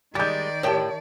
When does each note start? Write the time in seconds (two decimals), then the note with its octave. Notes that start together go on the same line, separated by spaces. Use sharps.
0.15 D#3 G3 G#3 D5 G6 A6
0.63 A2 G4 A#4 C#5 E5 G5 A5